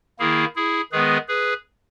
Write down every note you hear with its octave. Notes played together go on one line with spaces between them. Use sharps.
D#3 A#3 E4 G#4
E4 G#4
D#3 G#3 B3 G#4 B4
G#4 B4